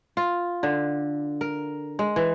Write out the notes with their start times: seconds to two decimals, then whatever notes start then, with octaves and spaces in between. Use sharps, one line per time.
0.17 F4
0.63 D3
1.41 A#4
1.99 G#3
2.16 E3